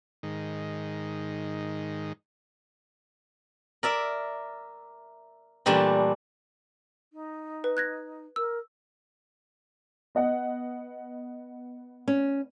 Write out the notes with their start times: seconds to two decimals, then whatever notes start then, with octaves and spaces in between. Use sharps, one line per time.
0.23 G#2 D#3
3.83 A#4 D5 E5
5.66 A#2 E3 G3 A3 D4 E4
7.12 D#4
7.64 B4
7.77 F#6 G#6 A#6
8.36 A#4 E6
10.15 B3 D#5 F#5
12.08 C#4